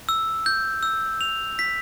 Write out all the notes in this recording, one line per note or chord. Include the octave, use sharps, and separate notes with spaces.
E6
G6
E6
F7
B6